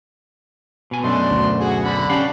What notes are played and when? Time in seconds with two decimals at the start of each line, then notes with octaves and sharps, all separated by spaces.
0.91 B2 G#5
1.03 F#2 B2 A3 D4 C6
1.31 D2
1.60 F#4 G#4
1.84 D3 B5
2.09 C#4 D4 G4 F5 F#5